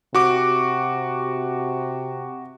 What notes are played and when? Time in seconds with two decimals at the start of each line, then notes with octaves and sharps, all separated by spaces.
0.15 C3 F#4 D6